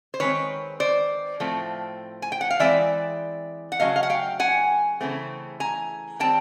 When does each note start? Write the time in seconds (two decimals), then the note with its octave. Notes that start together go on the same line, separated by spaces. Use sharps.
0.14 C5
0.20 D#3 G#3 C4 B4 C#5
0.80 C5 D5
1.40 A2 F3 A3 C4
2.22 G#5
2.32 G5
2.41 F#5
2.50 F5
2.59 E3 G#3 C4 D5 E5
3.72 F#5
3.80 C#3 F#3 A3 D#5 F5
3.96 F5
4.03 F#5
4.10 F5 G5
4.40 F#5 G#5
5.01 C#3 E3 A3 C4
5.60 G#5 A#5
6.20 D#3 G3 C4 G5 A5